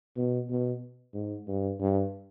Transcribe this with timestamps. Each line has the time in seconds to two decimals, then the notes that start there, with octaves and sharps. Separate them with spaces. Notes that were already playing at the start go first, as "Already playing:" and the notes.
0.16 B2
0.50 B2
1.14 G#2
1.48 G2
1.80 G2